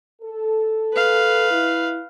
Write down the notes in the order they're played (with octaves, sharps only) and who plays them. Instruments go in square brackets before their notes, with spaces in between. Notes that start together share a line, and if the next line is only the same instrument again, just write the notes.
[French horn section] A4
[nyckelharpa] B4 F5
[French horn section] E4